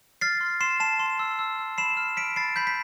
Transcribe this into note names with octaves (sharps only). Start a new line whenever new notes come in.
F6 A6 C7
C6
C6 C7 E7
A5 C7 E7
C6
E6
E6
E6
B5 C7 E7
F6
B5 B6 D7
B5 A6 C7
B5 G6 B6
B6